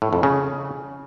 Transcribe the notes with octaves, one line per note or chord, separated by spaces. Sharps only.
A2
F2
C#3